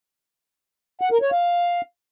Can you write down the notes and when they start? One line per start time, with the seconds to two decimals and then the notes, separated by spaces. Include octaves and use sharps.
1.01 F#5
1.12 A#4
1.22 C#5
1.32 F5